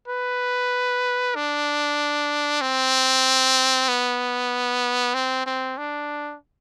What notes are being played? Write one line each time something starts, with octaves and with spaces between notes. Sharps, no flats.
B4
D4
C4
B3
C4
C4
D4